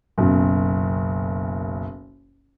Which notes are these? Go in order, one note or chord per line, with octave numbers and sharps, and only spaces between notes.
F#1 B1 F#2